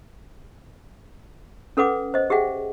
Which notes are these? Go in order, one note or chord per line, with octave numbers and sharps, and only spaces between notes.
C#4 A4 B4 F#5 D6
C5 D#5
G4 G#4 E5 F#5 G5